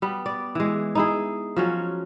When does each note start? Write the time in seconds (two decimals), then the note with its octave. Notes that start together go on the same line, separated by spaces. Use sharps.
0.02 G3 B3
0.26 D5
0.55 E3 G#3
0.95 D#4 E4 G#4
1.56 F3 F#3 C#4